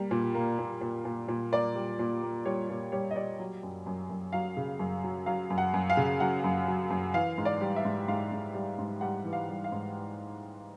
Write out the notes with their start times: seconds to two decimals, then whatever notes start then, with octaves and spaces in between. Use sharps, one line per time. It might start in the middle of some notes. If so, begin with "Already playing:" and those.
Already playing: G3 A#3
0.11 A#2
0.35 A#3
0.59 A#2
0.81 A#2
1.05 A#2
1.28 A#2
1.52 A#3 D5
1.75 G3
1.99 A#2
2.22 A#3
2.45 G3 C#5
2.70 A#2
2.92 G3 C#5
3.11 D#5
3.16 G3 D5
3.39 F#3
3.63 F#2
3.86 F#2
4.10 F#2
4.33 F#3 F5
4.57 C#3
4.79 F#2
5.04 F#3
5.26 F#3 F5
5.50 F#2
5.58 F#5
5.74 F#2
5.90 F5
5.97 C#3
6.20 F#3 F#5
6.44 F#2
6.68 F#3
6.90 F#2
7.14 E3 F5
7.38 G#2
7.45 D5
7.61 G3
7.76 E5
7.85 G#2
8.08 G#2 F5
8.32 G#2
8.54 G3
8.78 G#2
9.01 G3 F#5
9.24 E3
9.33 F5
9.49 G3
9.64 F5
9.72 G#2